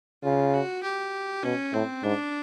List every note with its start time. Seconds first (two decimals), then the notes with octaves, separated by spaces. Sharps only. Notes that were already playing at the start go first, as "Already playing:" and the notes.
0.23 C#3 F4
0.54 F#4
0.83 G4
1.44 B2 C#4
1.73 A2 C4
2.03 G#2 D4